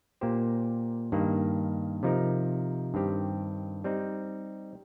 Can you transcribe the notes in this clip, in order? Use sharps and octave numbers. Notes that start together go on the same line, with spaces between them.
A#2 A#3 G4 C5
G2 D#3 A#3
C3 F3 D#4 A#4
G2 D#3 C4 G4
G3 C4 D#4